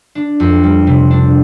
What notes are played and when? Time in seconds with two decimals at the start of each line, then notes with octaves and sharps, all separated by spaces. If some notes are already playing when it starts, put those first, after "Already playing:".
0.15 D4
0.40 F2
0.63 G3
0.87 C3
1.11 D4